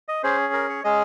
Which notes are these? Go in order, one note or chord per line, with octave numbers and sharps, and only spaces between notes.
D#5
C#4 G#4 C5
A#4
C#5
G#3 C#4 G#4 D#5